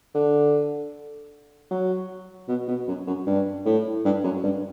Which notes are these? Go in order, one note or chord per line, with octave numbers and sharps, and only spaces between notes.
D3
F#3
B2
B2
F#2
F#2
G2
A2
G2
F#2
G2